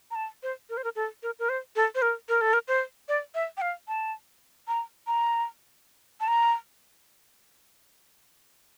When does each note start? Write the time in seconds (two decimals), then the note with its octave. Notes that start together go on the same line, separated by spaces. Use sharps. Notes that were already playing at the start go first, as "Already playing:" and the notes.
0.11 A#5
0.15 A5
0.43 C5
0.70 A#4
0.77 C5
0.84 A#4
0.96 A4
1.23 A#4
1.39 A#4
1.49 C5
1.76 A4
1.95 C5
2.02 A#4
2.29 A#4
2.41 A4
2.53 A#4
2.68 C5
3.09 D5
3.35 E5
3.57 G5
3.61 F5
3.88 A5
4.68 A#5
5.07 A#5
6.21 A5
6.28 A#5